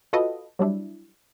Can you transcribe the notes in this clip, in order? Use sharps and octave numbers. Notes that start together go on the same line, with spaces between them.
F4 F#4 A4 B4 D#5
F#3 G3 D4 E4